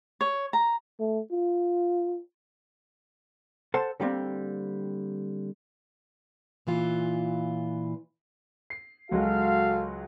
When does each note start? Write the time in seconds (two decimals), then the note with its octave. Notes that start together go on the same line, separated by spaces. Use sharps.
0.21 C#5
0.53 A#5
1.00 A3
1.32 F4
3.74 A4 C5 F#5 A5
4.00 D3 G3 A#3 C4
6.67 A#2 E3 F4
8.70 C7
9.11 C#2 F#3 G#3 F#4 A4 F5